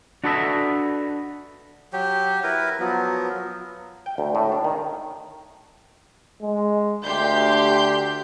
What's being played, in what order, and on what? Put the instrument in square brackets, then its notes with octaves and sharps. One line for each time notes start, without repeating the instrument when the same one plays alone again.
[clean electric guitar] D4 F#4 A4 B4 D#5 E5
[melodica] F#3 G4
E4 A#4 B4
[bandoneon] F3 F#3 B3 [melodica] A#4
[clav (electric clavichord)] G5
D2
A2
D4
D#3
[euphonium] G#3
[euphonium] D2 [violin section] G4 C6 G6